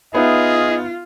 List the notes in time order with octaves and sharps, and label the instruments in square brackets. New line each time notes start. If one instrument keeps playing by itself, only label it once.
[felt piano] B3 D#4 E5 [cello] F4 [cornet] G#4 [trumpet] D#5